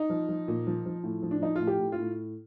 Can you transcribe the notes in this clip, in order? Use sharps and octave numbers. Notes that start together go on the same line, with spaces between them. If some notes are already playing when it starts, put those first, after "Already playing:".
Already playing: D#4
F3
F3
A#2
F3
F3
A2
F3
D4
F3 D#4
A2 F4
G4
A2
F4
A2